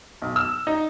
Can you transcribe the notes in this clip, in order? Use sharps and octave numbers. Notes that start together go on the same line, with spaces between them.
B1
E6
D#4